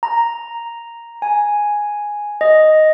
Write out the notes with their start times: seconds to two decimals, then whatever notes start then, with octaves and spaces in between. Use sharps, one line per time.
0.03 A#5
1.22 G#5
2.41 D#5